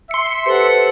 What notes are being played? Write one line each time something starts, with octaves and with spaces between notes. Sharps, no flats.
E5 C6 C#7
G4 A4 B4 C5 F#5